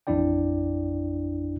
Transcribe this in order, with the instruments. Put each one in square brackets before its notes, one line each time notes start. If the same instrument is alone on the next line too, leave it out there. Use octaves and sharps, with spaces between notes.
[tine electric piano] A1 F2 D4 E4 D5 G5